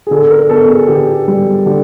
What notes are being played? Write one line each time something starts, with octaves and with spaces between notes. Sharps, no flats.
G#4
D3 A4
A#4
B3 A4
G#4
D3 G4
G3
D3 G4